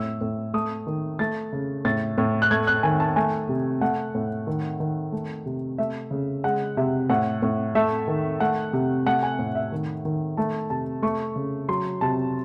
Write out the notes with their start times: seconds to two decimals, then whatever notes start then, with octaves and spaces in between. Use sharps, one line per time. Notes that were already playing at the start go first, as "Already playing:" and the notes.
Already playing: A2 E6
0.21 A2
0.54 A3 D#6
0.87 D#3
1.19 A3 A6
1.53 C#3
1.85 A2 A6
2.18 A2
2.42 F#6
2.51 A3 G#6
2.67 F#6
2.83 D#3 G#5
3.00 A5
3.16 A3 G#5
3.49 C3
3.81 A3 F#5
4.15 A2
4.47 D#3
4.80 D#3
5.12 A3
5.46 C3
5.78 A3 E5
6.11 C#3
6.44 G#3 F#5
6.77 C3 E5
7.10 A2 F#5
7.42 A2
7.75 A3 E5
8.08 D#3
8.40 A3 F#5
8.73 C3
9.06 A3 F#5
9.23 G#5
9.39 A2
9.55 E5
9.72 D#3
10.05 D#3
10.37 A3 A5
10.70 C3 A5
11.02 A3 C#6
11.36 C#3
11.68 F#3 C6
12.01 C3 A5